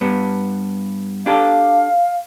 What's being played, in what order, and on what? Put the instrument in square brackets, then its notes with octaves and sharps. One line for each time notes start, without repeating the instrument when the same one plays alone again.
[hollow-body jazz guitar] G2 B3
[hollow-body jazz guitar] D4 G4 A4 [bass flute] F5